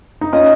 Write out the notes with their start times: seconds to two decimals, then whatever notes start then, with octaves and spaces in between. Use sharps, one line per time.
0.21 D#4
0.33 C#4 F4 D#5